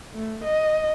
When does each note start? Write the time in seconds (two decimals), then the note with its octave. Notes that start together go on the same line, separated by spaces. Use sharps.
0.15 A3
0.44 D#5